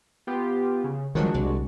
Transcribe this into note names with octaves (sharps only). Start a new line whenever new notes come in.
B3 F4 G4
C#3
D#3 F3 F#3 G#3 D4 F#4
C2